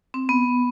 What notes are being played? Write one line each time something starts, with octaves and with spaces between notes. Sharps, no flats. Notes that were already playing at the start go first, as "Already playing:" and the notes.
C4
B3